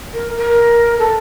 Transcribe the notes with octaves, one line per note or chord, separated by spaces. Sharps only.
A#4
A#4
A4